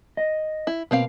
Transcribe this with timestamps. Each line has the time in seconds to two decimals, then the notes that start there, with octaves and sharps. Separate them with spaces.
0.17 D#5
0.67 E4
0.91 B2 A#3 C4 F5